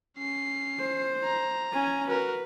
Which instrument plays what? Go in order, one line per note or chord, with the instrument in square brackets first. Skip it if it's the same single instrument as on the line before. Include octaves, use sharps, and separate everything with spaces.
[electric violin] C#4 C7
[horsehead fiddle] C5
[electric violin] A#5
[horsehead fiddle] C#4 G#5
[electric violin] F#4 A#4 [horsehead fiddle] B4